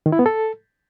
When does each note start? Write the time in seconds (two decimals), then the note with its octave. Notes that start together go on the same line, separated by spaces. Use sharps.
0.06 D#3
0.12 E4
0.19 B3
0.26 A4